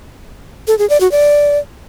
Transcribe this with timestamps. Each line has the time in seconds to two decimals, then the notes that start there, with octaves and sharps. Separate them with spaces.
0.67 A4
0.78 G#4
0.89 D5
1.00 F#4
1.11 D5